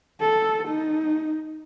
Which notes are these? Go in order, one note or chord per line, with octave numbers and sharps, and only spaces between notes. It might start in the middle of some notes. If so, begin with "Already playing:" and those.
A4
D#4